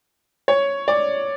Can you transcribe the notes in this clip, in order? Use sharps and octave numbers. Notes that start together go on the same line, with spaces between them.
C#5
D5